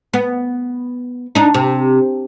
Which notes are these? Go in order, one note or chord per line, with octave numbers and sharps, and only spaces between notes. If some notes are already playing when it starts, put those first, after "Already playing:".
B3
D4 D#4
C3